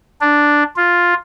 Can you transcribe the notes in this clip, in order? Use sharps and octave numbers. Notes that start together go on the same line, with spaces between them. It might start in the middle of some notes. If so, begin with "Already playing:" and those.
D4
F4